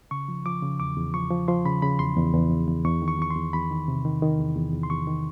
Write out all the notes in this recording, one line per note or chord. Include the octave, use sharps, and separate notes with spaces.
C#3 C#6
F3
F3 D6
C#3
E2 D6
E2
F3 C#6
F3
F3 C6
C#3 B5
C#3 B5
E2 C6
E2
E2
E2
E2
E2 C#6
D#3
C#6
E2 C#6
C6
E2
E2 B5
D#3
C3
D#3
D#3
E2
E2
E2
C6
E2 C#6
D#3